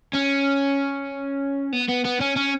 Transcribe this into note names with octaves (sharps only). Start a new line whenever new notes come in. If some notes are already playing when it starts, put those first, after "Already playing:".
C#4
B3
B3
B3
C#4
C#4